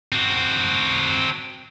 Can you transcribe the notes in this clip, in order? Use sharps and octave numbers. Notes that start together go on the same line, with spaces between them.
C4 F#4